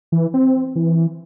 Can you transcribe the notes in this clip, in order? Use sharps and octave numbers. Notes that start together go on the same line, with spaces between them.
E3
C4
E3